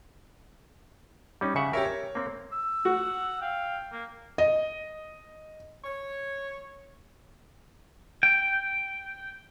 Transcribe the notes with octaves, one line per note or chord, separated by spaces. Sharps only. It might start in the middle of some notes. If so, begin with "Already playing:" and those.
G3 C#4 D#4
C#3 E5 F#5 C#7
G4 A#4 C#5 E5
C#5
A#3 C4
E6
F#4 F#5
F5 G5
A#3
D#5
C#5
G5